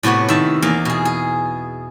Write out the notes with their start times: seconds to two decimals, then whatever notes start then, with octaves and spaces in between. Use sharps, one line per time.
0.03 A2 C3 B3 F#4 C#5
0.29 D#3 E5 A5
0.62 E2 A#3 F5
0.85 B2 G#4
1.05 G#4